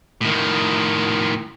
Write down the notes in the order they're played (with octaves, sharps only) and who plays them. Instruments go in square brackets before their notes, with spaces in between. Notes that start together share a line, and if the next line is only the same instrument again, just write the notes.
[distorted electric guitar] A2 D#3